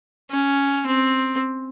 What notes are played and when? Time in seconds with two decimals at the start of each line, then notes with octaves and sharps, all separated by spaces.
0.31 C#4
0.86 C4